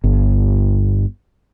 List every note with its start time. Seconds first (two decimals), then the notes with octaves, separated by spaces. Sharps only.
0.04 G1